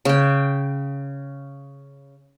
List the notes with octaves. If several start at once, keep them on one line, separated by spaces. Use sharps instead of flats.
C#3 G5